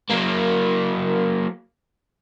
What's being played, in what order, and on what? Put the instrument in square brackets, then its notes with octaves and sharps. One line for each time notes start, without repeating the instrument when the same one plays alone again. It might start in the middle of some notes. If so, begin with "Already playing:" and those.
[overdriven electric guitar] F#3 A#3